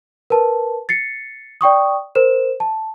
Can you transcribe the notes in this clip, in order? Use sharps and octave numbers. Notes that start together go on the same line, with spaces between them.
A#4 B4 A5
A6 C7 C#7
D5 G5 C#6 D#6
A#4 C5 E7
A5